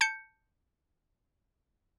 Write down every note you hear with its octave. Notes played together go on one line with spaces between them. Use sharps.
A5 G6 C#7